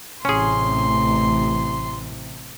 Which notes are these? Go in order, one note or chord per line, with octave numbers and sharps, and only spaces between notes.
A1 C3 C#4 G#4 C6